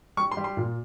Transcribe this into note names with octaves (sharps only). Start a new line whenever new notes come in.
G3 C#6
C6
G3
C6
A#2